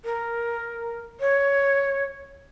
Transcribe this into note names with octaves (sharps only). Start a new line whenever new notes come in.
A#4
C#5